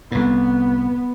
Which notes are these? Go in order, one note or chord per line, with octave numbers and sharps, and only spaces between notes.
C2 A2 B3